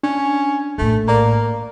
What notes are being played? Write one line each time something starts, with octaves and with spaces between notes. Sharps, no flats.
C#4 D4
A#1 A2 A3
A#3 D5 A#5